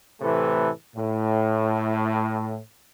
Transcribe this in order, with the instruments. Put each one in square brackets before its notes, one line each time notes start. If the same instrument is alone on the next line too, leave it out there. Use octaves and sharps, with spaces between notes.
[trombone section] A2 C3 E3 A3 A4 B4
A2